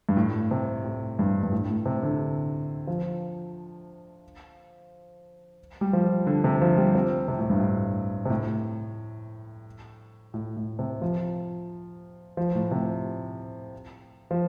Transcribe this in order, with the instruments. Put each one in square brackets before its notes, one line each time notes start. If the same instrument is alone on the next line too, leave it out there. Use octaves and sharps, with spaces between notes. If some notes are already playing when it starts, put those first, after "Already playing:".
[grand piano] G2
A2
C3
A2
G2
G2
A2
A2
C3
D3
F3
G3
F3
D3
C3
F3
G3
C4
C3
A2
G2
A2
C3
A2
A2
A2
C3
F3
F3
A2
C3
F3